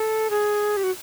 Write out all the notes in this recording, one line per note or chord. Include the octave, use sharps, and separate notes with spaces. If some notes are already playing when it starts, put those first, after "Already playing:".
Already playing: A4
G#4
G4
F#4